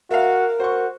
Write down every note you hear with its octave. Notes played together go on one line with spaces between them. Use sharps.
F#4 A#4 E5 F5
F#4 C5 C#6